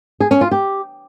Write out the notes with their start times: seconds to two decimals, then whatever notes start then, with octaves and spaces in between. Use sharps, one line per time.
0.20 G#4
0.31 C#4
0.41 F4
0.51 G4